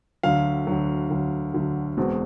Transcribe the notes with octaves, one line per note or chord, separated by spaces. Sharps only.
D2 D3 F#3 F5
D2 D3 F#3
D2 D3 F#3
D2 D3 F#3
E1 E2 B2 G#3 C4